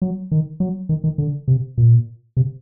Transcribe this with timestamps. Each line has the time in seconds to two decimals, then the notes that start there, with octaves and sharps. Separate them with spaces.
0.02 F#3
0.31 D#3
0.60 F#3
0.89 D#3
1.04 D#3
1.18 D3
1.48 C3
1.78 A#2
2.37 C3